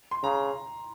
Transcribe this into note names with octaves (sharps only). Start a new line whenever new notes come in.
C6
C#3 A#5